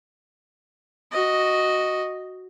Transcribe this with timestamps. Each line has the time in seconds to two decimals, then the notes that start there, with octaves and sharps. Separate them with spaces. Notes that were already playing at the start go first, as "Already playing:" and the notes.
1.12 F#4 D#5